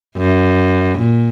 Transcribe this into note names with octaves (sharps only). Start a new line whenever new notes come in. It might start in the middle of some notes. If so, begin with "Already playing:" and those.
F#2
A#2